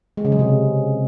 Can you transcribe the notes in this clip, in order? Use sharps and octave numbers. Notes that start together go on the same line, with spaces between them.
G#3
C#3
F#3
C3